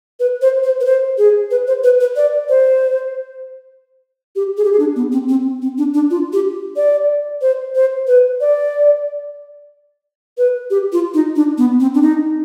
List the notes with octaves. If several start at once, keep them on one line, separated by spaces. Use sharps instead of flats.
B4
C5
C5
B4
C5
G#4
B4
C5
B4
B4
D5
C5
G4
G#4
G4
G#4
D4
B3
C4
C4
C4
D4
D4
F4
G4
D5
C5
C5
B4
D5
B4
G4
F4
D#4
D4
B3
C4
D4
D#4